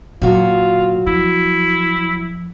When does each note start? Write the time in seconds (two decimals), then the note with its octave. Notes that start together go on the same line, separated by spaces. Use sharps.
0.22 A#2 D3 F#3 F4 F#4
1.06 F3 E4